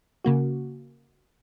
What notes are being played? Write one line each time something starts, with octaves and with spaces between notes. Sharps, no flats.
C#3 A#3 F#4